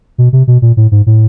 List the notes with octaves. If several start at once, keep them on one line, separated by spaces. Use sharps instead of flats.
B2
C3
B2
A#2
A2
G#2
A2